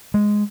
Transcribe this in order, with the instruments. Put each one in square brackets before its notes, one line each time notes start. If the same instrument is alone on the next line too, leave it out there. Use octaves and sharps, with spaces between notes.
[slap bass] G#3